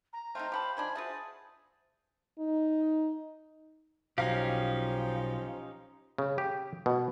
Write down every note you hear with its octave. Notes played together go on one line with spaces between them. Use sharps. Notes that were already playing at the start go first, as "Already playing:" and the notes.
A#5
A3 C4 D#4 C5 F5 G5
G4 F#5 A5 B5
D#3 F3 D4 C5 G#5 B5
F4 F#4 G#4 C5 E5 A5
D#4
B1 F3 C#4 D#4 G4 F5
C#3
G4
B2